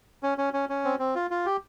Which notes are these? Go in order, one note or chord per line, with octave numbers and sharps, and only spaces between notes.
C#4
C#4
C#4
C#4
C4
C4
F4
F4
G4